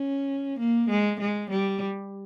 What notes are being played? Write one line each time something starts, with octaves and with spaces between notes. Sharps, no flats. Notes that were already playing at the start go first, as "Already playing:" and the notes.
Already playing: C#4
A#3
G#3
G#3
G3